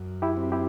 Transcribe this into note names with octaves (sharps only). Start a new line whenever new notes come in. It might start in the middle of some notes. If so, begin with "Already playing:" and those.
Already playing: F#2
E4 G4
C4
E4 G4